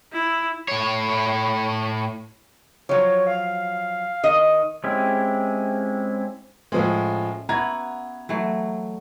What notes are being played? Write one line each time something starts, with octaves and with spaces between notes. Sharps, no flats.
E4
A2 C#5
F3 F#3 C#5
F5
D#3 D#5
G#3 C4 C#4 E4 G4
A2 F3 G#3 C#4
B3 E4 F#4 A#5 G#6
E3 F#3 A3